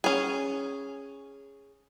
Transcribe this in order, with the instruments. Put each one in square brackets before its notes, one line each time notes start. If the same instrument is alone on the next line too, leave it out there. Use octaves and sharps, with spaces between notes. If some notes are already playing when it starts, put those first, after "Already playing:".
[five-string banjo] C#4 G#4